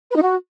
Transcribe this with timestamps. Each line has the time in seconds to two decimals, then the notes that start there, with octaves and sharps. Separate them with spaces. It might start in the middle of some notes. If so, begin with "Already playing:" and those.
0.10 B4
0.16 D#4
0.21 F#4